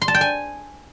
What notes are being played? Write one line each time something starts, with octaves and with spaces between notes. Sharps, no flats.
C6
A5
G5
G#5